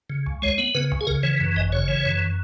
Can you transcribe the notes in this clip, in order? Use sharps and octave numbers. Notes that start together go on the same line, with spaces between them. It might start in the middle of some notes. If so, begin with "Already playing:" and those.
C#3
C#2
G#3 C#5
B3
C#3 B4
C#2
G#4
C#3 A#4
E3 C#5
F#2
G#1 D#5
C#3 C#5
E3
F#2